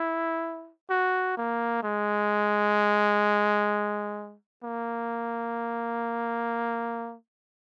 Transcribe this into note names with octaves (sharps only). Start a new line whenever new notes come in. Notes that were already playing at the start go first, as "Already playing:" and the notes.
Already playing: E4
F#4
A#3
G#3
A#3